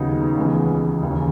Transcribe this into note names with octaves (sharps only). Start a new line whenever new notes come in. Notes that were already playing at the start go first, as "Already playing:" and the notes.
Already playing: D#2 C#3 F#3 B3 D#4
C#2 C#3 E3 G#3 B3
D#2 C#3 E3